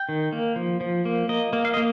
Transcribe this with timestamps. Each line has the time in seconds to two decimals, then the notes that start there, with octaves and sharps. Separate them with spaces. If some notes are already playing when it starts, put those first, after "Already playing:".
Already playing: G5
0.09 D#3
0.33 A#3
0.56 F3
0.81 F3
1.05 A#3
1.29 A#3 D#5
1.53 A#3
1.65 F5
1.74 D#5
1.77 A#3